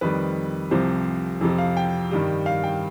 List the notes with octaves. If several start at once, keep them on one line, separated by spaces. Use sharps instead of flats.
F2 D#3 G3 B4
C2 C3 F3 C5
F2 C3 F3
F5
G5
G2 D#3 G3
F5
G5